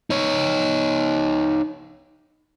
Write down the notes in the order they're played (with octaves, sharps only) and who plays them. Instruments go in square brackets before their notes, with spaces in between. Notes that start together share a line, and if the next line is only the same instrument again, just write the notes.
[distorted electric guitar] D#4 C#5